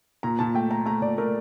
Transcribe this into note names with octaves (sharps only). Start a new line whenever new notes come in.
A#2 A#5
A#2 A5
A3 G5
A3 A#5
A3 A#5
A#2 D5
A3 A#4